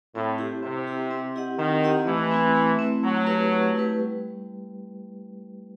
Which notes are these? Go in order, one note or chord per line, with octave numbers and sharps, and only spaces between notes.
A2 C4
E4 G4
C3 C4
E4 G4
C4
E4 G4 D#5 F#5
D#3 C4
E4 G4 D#5 F#5
E3 A3
C4 E4
A3
C4 E4
F#3 A3
E4 G4 B4
A3
E4 G4 B4
G3